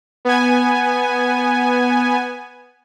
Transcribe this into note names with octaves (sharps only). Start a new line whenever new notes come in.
B3 G#5